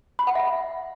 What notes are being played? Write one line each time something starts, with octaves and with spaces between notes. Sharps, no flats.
B5
F#5
E5